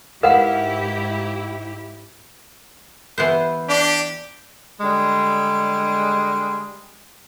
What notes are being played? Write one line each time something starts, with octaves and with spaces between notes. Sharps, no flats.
G#2 E4 G4 A#4 B4 F5 F#5
E3 B3 C5
D4 G4
D3 G3 G#3